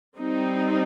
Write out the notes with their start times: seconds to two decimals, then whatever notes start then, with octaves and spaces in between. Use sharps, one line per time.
0.17 G3 C4 D#4